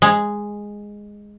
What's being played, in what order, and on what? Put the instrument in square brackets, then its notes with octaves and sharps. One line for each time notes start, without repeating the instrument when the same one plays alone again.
[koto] G#3